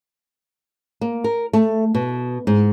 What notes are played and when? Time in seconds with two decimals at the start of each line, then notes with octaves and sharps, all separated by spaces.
1.01 A#3
1.24 A#4
1.53 A3
1.95 B2
2.47 G#2